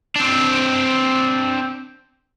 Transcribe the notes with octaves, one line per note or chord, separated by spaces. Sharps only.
C4 D4